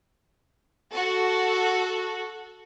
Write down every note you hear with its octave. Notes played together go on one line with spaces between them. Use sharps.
F#4 A4